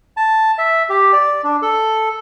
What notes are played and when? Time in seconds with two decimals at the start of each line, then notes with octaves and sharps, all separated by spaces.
0.17 A5
0.58 E5
0.90 G4
1.13 D5
1.44 D4
1.62 A4